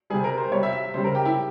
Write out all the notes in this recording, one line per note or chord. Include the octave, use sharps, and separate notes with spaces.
C3 G3 G#4
A#4
C5
C3 G3 C#5
E5
E5
C#3 G3 C5
A#4
G4
E4